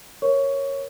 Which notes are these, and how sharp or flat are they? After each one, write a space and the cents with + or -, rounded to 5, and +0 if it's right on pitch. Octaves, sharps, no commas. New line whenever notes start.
A#4 +0 C#5 -10 C#6 +15